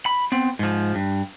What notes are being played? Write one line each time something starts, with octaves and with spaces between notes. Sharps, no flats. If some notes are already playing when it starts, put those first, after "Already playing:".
B5
B3 C4
G#2 F3
G2